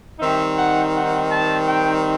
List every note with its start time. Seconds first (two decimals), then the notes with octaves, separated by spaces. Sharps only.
0.19 D#3 G3 C4 D#4 E5
0.56 F#5
0.93 F#5
1.30 A5
1.67 G5